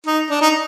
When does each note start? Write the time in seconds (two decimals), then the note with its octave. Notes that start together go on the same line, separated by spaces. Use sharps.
0.06 D#4
0.30 D4
0.42 D#4